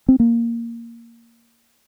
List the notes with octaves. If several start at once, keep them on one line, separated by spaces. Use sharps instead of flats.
C4
A#3